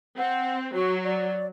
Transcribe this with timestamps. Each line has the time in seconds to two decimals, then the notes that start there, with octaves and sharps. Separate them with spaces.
0.18 C4 F#5
0.74 F#3 F#4
1.04 D5